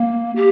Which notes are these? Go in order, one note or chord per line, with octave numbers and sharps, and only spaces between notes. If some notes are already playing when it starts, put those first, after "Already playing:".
Already playing: A#3
G4